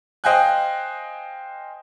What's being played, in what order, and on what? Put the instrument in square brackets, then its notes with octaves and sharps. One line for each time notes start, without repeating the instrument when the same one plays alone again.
[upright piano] C5 D#5 F5 G5 G#5 F#6